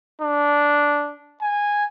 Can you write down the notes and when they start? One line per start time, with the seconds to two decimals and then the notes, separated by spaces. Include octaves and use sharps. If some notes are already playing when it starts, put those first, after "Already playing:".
0.21 D4
1.41 G#5